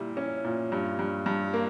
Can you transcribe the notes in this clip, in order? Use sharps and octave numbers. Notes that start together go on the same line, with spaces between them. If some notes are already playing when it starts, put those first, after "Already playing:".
Already playing: A#2 G3 E4
C#4
A#2
G2
G2
G2
A#3